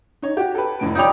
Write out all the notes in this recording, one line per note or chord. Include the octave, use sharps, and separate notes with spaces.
D#4 C#5
F#4 G4
A4 B4
F1 A2 D7
A#1 G3 D#4 C#5 F7